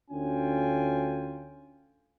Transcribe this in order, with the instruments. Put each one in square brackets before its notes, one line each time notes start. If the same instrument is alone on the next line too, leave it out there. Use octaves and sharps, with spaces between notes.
[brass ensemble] D2 C#4 F4 G5 G#5